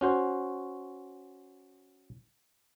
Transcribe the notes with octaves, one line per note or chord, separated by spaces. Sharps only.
C#4 F#4 C5